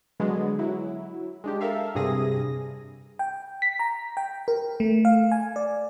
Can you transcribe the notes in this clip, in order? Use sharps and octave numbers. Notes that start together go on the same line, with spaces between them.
D3 F#3 G#3 B3
F#3 E4
G#3 D4 G4
A4 A#4 E5 F5
G2 C3 G#4 D#6 A#6
G5
B6
A#5
G5
A#4
A3
F5
G#5
D5